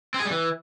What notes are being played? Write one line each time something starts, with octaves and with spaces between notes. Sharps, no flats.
C4
G#4
G3
E3